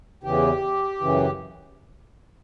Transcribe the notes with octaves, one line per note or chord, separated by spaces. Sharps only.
E2 C#3 E3 G4
F#2 C#3 E3